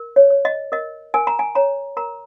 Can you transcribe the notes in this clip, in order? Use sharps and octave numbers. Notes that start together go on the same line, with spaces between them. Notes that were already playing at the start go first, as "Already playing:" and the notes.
Already playing: A#4
C#5
C#5
D#5
A#4 D#5
A#4 G#5
A#5
G#5
C#5 A#5
A#4 A#5